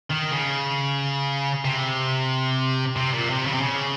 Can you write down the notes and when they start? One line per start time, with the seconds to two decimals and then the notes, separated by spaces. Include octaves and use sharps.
0.10 D#3
0.32 C#3
1.65 C3
2.96 C3
3.14 A#2
3.30 C3
3.47 C#3
3.53 C3
3.61 C#3